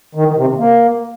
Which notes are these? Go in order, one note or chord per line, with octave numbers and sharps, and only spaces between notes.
D#3
D#3
C3
C3
A#3